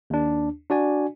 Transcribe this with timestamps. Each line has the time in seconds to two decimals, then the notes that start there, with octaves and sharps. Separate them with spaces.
0.10 D#2 D4
0.70 D4 F#4 D5 G#5